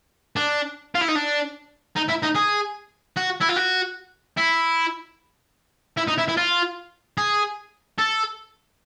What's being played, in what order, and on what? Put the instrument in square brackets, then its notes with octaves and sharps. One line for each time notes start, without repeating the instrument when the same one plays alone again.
[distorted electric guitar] D4
F4
E4
D#4
D4
D#4
E4
D#4
G#4
F#4
E4
F4
F#4
E4
E4
D#4
E4
E4
F4
G#4
A4